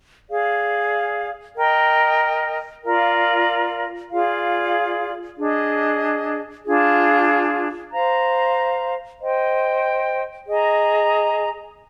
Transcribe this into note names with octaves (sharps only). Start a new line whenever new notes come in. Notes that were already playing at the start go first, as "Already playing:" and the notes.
G#4 D5 F5
A#4 D#5 G5
F4 A#4 D5 F5
F4 G#4 D5 F5
D4 G#4 D#5
D4 F4 G#4
C5 F5 A#5
C5 D#5 G5
G#4 D#5 A#5